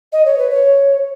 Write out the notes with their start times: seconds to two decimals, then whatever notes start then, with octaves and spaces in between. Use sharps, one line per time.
0.12 D#5
0.25 C#5
0.38 B4
0.50 C#5